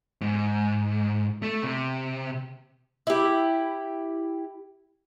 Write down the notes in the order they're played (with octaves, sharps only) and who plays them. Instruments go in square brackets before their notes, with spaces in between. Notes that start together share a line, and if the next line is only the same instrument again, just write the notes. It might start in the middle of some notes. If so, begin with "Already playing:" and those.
[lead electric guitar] G#2
A3
C3
[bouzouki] E4 G4